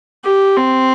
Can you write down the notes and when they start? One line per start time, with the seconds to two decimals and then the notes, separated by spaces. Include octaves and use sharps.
0.25 G4
0.57 C4